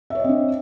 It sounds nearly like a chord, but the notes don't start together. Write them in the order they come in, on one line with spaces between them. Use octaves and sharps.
E5 C#5 D#5 C4 D4